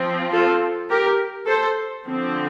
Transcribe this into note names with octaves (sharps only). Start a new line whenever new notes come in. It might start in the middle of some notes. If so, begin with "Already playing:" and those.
Already playing: F3 C4
F4 A4
G4 A#4
A4 C5
D3 F3 C4